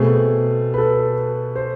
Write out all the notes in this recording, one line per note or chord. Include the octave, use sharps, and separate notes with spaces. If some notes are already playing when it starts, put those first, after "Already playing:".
Already playing: B2 A3 C4 G#4
B4
A4
C5